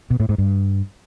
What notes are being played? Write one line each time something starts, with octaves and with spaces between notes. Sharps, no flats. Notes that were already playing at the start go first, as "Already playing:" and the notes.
B2
A2
G#2
G2